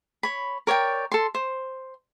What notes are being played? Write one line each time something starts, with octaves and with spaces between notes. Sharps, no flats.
C#5 B5
A#4 C#5 D5 G5
A4 C6
C5